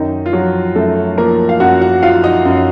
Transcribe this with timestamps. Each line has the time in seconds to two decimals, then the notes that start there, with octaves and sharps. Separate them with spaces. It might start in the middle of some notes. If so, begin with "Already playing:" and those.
Already playing: F#2 D#3 D#4
0.26 F4
0.33 F3 F#3 F#4
0.75 F#2 A3 A4
1.18 F3 A#3 A#4
1.49 F5
1.60 F#2 F#4 F#5
1.81 F#4 F#5
2.03 F3 F4 F5
2.24 D#4 D#5
2.45 F#2